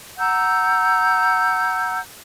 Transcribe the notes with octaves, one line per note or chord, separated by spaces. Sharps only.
F#5 A#5 E6 G6